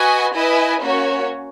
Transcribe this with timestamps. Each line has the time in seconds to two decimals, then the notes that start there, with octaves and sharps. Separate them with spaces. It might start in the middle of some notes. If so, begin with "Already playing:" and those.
Already playing: F#4 B4 D#5 G#5
0.35 E4 B4 D#5 G#5
0.83 A#3 C#4 F#4 C#5